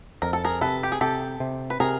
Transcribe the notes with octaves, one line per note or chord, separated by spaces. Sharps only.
F2 A#4
A4
G#4 A#4
C3 A4 B4
G4
G#4
C3 G4 A4
C3
B4
C3 G#4 A#4